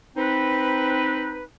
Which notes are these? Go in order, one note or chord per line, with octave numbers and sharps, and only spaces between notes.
C4 D#4 B4